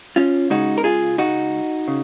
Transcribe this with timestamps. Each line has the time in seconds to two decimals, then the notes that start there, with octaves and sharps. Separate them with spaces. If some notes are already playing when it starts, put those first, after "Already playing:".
0.16 C#4 F4
0.50 C#2 C#3 G#3 D#4 F#4
0.78 A#4
0.84 F4 G#4
1.18 D#4 F#4
1.88 C#3